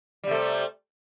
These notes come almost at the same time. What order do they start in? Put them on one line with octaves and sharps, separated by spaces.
G3 C3 A3